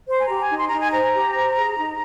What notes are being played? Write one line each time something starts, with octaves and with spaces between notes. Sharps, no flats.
C5 C6
G#5
A#5
G4
G#5
D#4
C6
D#4 A#5
G#5
C5 A#5
G4
C5
G#4
D#4